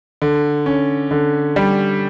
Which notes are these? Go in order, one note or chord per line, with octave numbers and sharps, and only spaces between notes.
D3
C#4
D3
G3